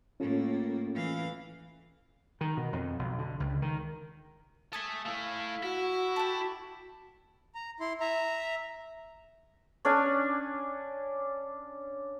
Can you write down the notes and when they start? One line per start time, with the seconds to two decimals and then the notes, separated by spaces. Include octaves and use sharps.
0.20 A2 A#3 C#4 F4 A4
0.95 E3 F5
2.41 D#3
2.57 B2
2.73 F2
2.99 B1
3.18 D3
3.40 C#2
3.62 D#3
4.73 A4 E5 G#5 D#6
5.06 A3 E4 F5
5.63 E4 F#4 F#5
6.16 G4 A4 A5
7.55 A#5
7.80 E4 C6
8.00 E5 A#5
9.85 C#4 D4 D5 G#5